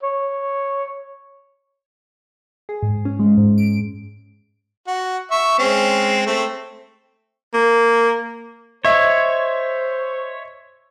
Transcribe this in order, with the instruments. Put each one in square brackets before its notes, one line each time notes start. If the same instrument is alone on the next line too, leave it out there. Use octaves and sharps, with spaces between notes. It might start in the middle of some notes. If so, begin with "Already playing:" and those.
[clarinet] C#5
[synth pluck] G#4
G#2
C#4
G#3
G#2
D7
[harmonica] F#4
E5 C#6
G#3 C4 C#4
A3 C4
[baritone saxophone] A#3
[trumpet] C5 [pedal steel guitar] C#5 [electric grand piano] D#5 E5